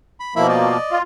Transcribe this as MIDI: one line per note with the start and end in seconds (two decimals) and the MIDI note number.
0.20 0.34 83
0.36 0.77 47
0.36 0.77 53
0.36 0.77 58
0.36 0.47 64
0.36 0.47 76
0.36 0.47 83
0.49 0.98 74
0.49 0.98 75
0.91 1.02 65